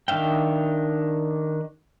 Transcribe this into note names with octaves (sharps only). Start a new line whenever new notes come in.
D#3 D4 E5 F5 G5